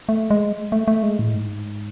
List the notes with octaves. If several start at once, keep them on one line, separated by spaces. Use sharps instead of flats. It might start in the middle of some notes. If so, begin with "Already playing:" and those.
A3
G#3
A3
A3
G#3
A2
G#2